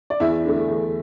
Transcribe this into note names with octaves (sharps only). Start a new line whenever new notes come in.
D5
E2 E4 E5
D3 A3
E2